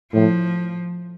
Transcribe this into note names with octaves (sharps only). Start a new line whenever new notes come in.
A2 F3